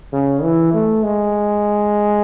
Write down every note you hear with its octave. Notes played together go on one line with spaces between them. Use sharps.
C#3
E3
A3
G#3